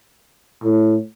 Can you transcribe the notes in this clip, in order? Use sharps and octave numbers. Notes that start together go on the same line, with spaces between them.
A2